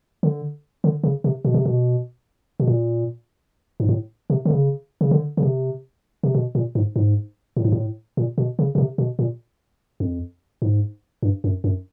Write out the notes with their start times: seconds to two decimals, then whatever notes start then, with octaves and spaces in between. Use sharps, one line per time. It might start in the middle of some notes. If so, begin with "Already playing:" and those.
0.23 D3
0.84 D3
1.04 C#3
1.24 C3
1.45 B2
1.54 C3
1.66 B2
2.60 B2
2.67 A#2
3.80 G#2
3.89 A2
4.30 C3
4.45 D3
4.51 C#3
5.01 C#3
5.11 D3
5.37 C#3
5.43 C3
6.23 C3
6.35 B2
6.55 A#2
6.75 G#2
6.96 G#2
7.57 A2
7.65 G#2
7.72 A2
8.17 A#2
8.38 B2
8.59 C#3
8.75 B2
8.78 C3
8.98 B2
9.19 A#2
10.00 F2
10.62 G#2
11.23 G2
11.44 F#2
11.64 F#2